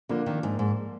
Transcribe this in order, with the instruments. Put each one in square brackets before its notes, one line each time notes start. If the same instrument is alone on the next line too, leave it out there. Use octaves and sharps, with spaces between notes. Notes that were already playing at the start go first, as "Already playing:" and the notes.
[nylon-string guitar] D3 [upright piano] F3 A#3 D4
[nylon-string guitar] D#3
G#2
G#2